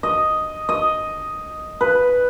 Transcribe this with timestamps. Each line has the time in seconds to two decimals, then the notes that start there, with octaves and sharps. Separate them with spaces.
0.03 D#5
0.69 D#5
1.81 B4